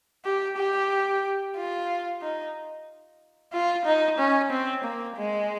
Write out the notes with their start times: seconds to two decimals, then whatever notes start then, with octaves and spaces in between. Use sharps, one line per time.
0.25 G4
0.57 G4
1.56 F4
2.22 D#4
3.53 F4
3.85 D#4
4.18 C#4
4.51 C4
4.84 A#3
5.17 G#3